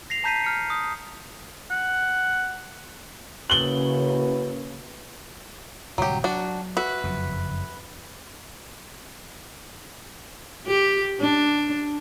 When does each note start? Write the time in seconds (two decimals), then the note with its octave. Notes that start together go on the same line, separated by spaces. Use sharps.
0.10 A#6 C7 F7
0.24 A5 A#5 G6 B6 C7 D#7
0.44 F6 C#7
0.70 D#6
1.71 F#5
3.50 C#3 A#3 C#4 E4 F#4 B4 F#7 G7
5.98 D1 C3 F#3 G3 G4
6.24 F#3 D4 F#4
6.77 F#4 B4 E5
7.04 F#1 F2 F#3
10.67 G4
11.20 D4